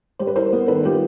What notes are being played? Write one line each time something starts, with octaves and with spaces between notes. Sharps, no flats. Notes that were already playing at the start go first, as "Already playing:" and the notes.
G3 C5
B4
E4 A#4 C5
B3
D#3 A4 B4
G3 F4 G4